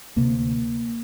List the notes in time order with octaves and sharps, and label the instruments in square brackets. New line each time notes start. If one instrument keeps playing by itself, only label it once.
[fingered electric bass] D2 C3 A#3